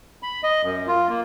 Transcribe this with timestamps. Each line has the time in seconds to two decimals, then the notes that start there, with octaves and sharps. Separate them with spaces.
0.23 B5
0.44 D#5
0.63 F#2
0.87 F4
1.09 A#3